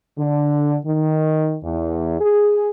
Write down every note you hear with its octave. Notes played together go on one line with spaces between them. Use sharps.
D3
D#3
E2
G#4